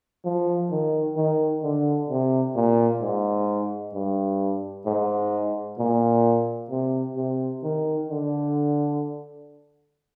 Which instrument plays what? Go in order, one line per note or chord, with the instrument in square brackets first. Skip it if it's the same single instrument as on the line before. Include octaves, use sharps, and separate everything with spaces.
[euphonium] F3
D#3
D#3
D3
C3
A#2
G#2
G2
G#2
A#2
C3
C3
D#3
D3